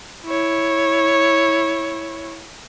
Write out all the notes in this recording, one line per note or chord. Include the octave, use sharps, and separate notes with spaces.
E4 C#5